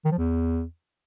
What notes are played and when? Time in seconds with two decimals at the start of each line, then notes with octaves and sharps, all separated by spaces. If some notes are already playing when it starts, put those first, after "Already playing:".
0.05 D#3
0.12 F3
0.18 E2